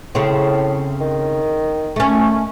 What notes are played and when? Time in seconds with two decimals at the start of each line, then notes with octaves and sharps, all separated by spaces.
0.15 A2 C#3 C4
1.01 D#3
1.96 A3 C#4